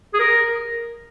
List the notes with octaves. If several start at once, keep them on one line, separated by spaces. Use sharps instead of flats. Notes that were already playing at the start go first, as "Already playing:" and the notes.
G#4
A#4